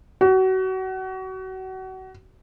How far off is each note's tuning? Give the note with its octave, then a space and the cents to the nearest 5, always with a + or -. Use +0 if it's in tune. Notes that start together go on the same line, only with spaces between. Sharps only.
F#4 +30